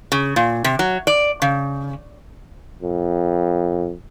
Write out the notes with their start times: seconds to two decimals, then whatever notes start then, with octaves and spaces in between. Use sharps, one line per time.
0.12 C#3
0.36 A#2
0.64 C3
0.79 F#3
1.07 D5
1.42 C#3
2.82 F2